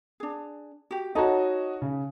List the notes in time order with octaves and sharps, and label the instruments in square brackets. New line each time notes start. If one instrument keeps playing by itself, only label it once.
[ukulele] D4 G#4
F#4 G4
[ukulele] D#4 A4 [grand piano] F#4 C#5 D#5
[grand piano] C#3